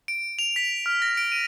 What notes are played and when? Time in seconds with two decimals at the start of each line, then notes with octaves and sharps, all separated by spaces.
0.08 D7
0.39 F7
0.56 B6
0.86 F6
1.02 A#6
1.17 D7
1.32 D#7